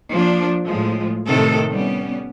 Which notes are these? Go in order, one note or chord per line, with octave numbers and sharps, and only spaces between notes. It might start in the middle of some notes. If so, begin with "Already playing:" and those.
F3 A#3 D4
A2 F3 G#3
A2 C3 D#3 A3 A4
G3 B3 C#4